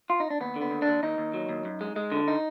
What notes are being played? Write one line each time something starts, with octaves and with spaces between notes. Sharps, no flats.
F4
D#4
D4
D#2 B3
D3
B3
D#2
D4
D#2
D#2 D#4
D#2
F#3
D#2
F#2
G#3
G#3
D3
D#4